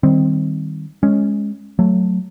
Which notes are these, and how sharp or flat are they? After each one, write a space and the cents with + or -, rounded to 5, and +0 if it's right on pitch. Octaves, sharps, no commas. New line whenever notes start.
D#3 +0 G3 +0 C4 +0
G#3 +0 C#4 +0
F#3 +0 A3 +5